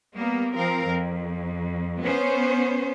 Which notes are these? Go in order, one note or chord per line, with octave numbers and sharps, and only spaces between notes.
G3 A#3 B3
F3 C4 A#4 F5
F2
B3 C#4 C5